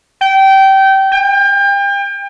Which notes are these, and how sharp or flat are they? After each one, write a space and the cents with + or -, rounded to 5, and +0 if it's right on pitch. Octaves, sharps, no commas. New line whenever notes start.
G5 -20
G5 +35